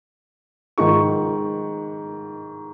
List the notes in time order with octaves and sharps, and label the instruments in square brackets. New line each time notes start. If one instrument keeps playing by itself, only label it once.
[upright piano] G#2 D#3 C#6